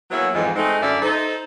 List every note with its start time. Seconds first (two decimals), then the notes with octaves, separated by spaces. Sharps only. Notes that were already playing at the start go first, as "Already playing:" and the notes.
0.11 F#3 A#3 B3 E4 G#4 C#5
0.34 F2 G#2 E3
0.55 G#3 A3 C4 D#4
0.81 F#2 D3 A#4 D5 E5
1.02 D#4 A4 C5